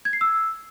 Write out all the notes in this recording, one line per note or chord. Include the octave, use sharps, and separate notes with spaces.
G#6
C7
E6